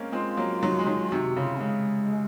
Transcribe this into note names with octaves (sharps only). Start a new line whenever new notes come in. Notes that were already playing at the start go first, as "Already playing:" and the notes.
Already playing: G#3 A#3 C4 C#4
G#3 C4 F4
F#3 A#3
D#3 F#3
G#3
D#3 F#3
C3 D#3 F#4
C#3 F4 F#4
C#3 G#3